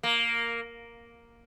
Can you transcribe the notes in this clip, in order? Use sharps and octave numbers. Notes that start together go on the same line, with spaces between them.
A#3